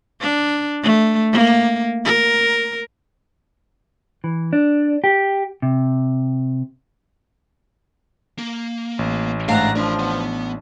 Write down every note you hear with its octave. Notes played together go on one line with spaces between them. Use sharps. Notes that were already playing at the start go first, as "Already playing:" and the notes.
D4
A3
A#3
A#4
E3
D4
G4
C3
A#3
A1
G#2 A3 D4 F5 F#5 A#5
F3 D4 A#4 B5
B3